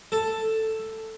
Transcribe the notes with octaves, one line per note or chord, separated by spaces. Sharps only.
A4